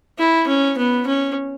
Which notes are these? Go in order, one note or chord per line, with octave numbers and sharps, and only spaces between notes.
E4
C#4
B3
C#4